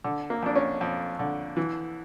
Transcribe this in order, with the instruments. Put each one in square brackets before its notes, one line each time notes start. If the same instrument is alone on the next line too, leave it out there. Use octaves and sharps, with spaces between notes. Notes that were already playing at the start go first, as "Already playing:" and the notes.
[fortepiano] D3
A#3
F2 D4
C#4
F2
D3
E3